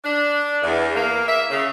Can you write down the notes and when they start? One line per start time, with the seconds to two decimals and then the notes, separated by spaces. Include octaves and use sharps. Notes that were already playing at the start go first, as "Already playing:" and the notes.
0.03 D4
0.63 E2
0.95 A#3
1.28 E5
1.50 C#3